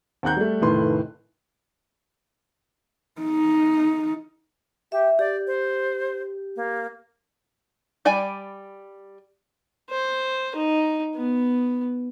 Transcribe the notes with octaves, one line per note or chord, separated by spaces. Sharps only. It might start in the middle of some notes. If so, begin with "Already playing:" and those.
D#2 C4 F#5 A#5 F#6 G6
G3 A3
F1 A2 D#3 B4 C6
D#4
G4 E5
G4 D5
C5
A#3
G3 D5 G5 G#5 B5
C5
D#4
B3